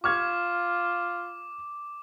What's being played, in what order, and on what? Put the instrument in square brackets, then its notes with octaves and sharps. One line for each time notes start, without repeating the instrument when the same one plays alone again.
[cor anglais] F4 [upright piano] C#6 F6 G#6 [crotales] D6